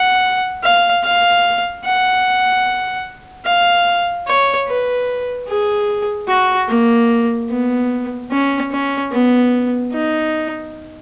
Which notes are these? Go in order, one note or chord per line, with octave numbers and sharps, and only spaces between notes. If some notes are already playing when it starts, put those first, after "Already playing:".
Already playing: F#5
F5
F5
F#5
F5
C#5
B4
G#4
F#4
A#3
B3
C#4
C#4
B3
D#4